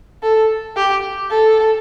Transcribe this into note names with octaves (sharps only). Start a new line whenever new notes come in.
A4
G4
A4